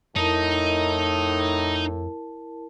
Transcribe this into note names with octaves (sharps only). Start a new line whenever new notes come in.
F2 A2 D#4 E4 A#4 A5